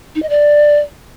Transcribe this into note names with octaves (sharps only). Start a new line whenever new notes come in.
D#4
D#5
D5